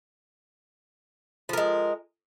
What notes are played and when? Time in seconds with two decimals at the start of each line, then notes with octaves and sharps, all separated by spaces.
1.49 F3
1.53 A#4
1.57 G#3